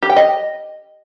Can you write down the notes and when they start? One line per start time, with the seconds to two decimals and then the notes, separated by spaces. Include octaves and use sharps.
0.03 G4
0.09 G5
0.16 D#5